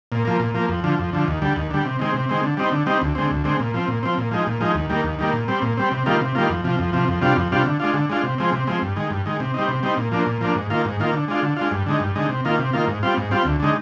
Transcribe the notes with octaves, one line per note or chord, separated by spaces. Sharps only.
A#2
F3 A#3
A#2
F3 A#3
F2
D3 F3
F2
D3 F3
D#2
D3 G3
D#2
D3 G3
C3
D#3 G#3 C4
C3
D#3 G#3 C4
D3
G3 C4 D#4
D3
G3 C4 D#4
D2
D3 G#3 C4
D2
D3 G#3 C4
A#2
F3 C4
A#2
F3 C4
A#2
F3 G#3 D#4
A#2
F3 G#3 D#4
D#2
D#3 G3 A#3
D#2
D#3 G3 A#3
A#2
G3 C4
A#2
G3 C4
C3
D#3 G3 A#3 F4
C3
D#3 G3 A#3 F4
F2
C3 F3
F2
C3 F3
F2
C3 G3 D4 F4
F2
C3 G3 D4 F4
D3
G#3 D4 F4
D3
G#3 D4 F4
C3
F3 G#3 C4
C3
F3 G#3 C4
G2
D#3 G#3
G2
D#3 G#3
C3
G3 C4 D#4
C3
G3 C4 D#4
A#2
F3 A#3 D4
A#2
F3 A#3 D4
G#2
D#3 A#3 F4
G#2
D#3 A#3 F4
D3
G#3 D4 F4
D3
G#3 D4 F4
G2
D3 G#3 D#4
G2
D3 G#3 D#4
C3
D#3 A#3 F4
C3
D#3 A#3 F4
G#2
G3 C4 F4
G#2
G3 C4 F4
D2
D3 G#3 D#4